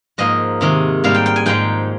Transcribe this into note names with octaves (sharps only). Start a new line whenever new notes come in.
G#2 F3 A#3 D#5
C3 D#3 G#3
G#2 G3 A#3 F5
G5
G5
G#5
G#2 F3 G#3 G5